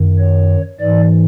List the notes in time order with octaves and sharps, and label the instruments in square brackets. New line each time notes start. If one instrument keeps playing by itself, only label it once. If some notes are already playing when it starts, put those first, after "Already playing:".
Already playing: [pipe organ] F#2 D#3
C#5
G#2 E3 D5